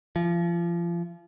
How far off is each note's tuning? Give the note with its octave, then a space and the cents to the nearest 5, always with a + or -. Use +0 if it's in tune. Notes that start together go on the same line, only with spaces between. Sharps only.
F3 -30